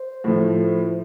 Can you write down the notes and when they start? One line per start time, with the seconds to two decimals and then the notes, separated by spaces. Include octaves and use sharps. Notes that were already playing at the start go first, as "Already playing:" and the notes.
Already playing: C5
0.24 A2 F3 A3